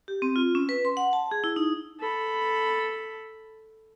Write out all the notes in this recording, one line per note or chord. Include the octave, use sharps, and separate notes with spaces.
G4
C4
F4
C#4
B4
C6
F#5
A5
G#4
E4
D#4
A4 B5